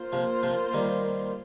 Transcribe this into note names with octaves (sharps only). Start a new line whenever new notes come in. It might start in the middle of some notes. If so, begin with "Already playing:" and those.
Already playing: A#3 F4 C5
C3 F3
C3 F3
D#3 G3